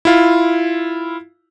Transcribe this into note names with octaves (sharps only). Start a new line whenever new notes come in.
E4 F4